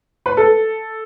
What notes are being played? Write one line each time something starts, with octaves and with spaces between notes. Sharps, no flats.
B4
A4